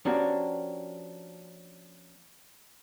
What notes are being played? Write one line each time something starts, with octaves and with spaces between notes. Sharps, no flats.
F3 A#3 C#4 D4 F#4 G4